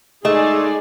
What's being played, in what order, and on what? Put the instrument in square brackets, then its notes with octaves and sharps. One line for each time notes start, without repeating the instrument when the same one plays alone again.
[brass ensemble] G#3 D#4 [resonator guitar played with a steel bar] A3 [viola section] G#4 D5 [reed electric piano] D#5